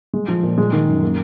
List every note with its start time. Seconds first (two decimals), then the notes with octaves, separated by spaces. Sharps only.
0.14 G#3
0.28 F3
0.43 A#2
0.58 G#3
0.73 D#3
0.88 F#2
1.03 A#3